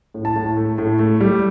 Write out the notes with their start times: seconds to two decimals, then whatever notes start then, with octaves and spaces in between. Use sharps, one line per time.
0.14 A2
0.25 A5
0.36 A2
0.57 A3
0.78 A2
0.99 A3
1.20 G3